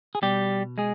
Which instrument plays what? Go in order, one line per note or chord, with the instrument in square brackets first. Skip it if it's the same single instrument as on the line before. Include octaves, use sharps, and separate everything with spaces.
[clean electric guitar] G#4
B2 G3 G4
G#3 G#4